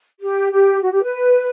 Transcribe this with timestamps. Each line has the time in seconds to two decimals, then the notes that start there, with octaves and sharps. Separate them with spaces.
0.20 G4
0.51 G4
0.82 F#4
0.92 G4
1.02 B4